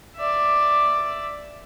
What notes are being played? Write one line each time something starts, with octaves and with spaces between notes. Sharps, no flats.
D5 E5